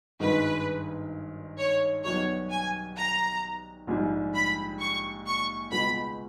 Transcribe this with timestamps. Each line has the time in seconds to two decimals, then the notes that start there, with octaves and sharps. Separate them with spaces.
0.20 G#1 G2 D#3 G#3 B4
1.58 C#5
2.04 B1 B2 G3 C#5
2.50 G#5
2.96 A#5
3.87 A#1 G#2 G3
4.34 B5
4.80 C#6
5.26 C#6
5.71 C#2 B2 G#3 B5